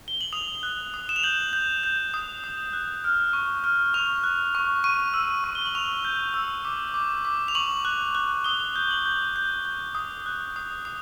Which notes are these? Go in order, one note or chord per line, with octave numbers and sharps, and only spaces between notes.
G7
F#7
D#6 F7
F#6
D#6
E7
F7
G6 F#7
G6
G6
D#6
D#6
F#6
F6
C#6
F6
C#6 F7
F#6
C#6
C#6 D#7
E6
C#6
G7
F#7
C#6 F7
G6
E6
D6
D6
D6
F7
C#6 F#7
F#6
F#6
D#6 G7
G6
F#7
G6
G6
G6
D#6
F#6
D#6
D#6